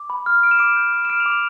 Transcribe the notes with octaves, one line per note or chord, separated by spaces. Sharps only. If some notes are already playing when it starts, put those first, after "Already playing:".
Already playing: D6
B5
F6
F6 D7
E7
D6 D7
G6
D6
E7
F6 D7
F7
D6
F7